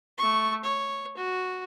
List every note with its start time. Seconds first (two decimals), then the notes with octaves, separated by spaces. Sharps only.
0.18 A3 C#6
0.64 C#5
1.17 F#4